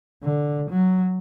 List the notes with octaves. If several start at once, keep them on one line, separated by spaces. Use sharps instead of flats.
D3
F#3